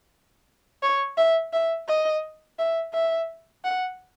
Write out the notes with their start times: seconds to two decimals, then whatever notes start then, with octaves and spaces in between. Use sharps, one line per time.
0.83 C#5
1.17 E5
1.53 E5
1.88 D#5
2.59 E5
2.94 E5
3.65 F#5